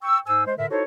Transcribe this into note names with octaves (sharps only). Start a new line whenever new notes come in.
G5 C#6 E6
G#2 C5 G#5 E6
G#3 C5
A2 D3 A#4 E5
D#4 E4 F#4 A4 C5 C#5